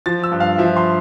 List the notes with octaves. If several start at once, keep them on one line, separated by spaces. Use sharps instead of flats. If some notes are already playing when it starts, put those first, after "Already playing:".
F3 A6
E6
G2
F5
F3 E5
C6